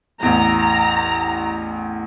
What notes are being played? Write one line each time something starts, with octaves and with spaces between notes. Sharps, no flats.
A1 E2 A#5